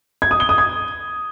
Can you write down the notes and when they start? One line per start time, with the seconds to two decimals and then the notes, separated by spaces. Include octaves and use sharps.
0.22 G#6
0.31 D#6
0.40 G7
0.49 D#6
0.58 G#6